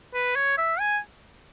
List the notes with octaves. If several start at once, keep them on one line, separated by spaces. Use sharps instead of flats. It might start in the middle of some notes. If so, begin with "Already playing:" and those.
B4
C#5
E5
G#5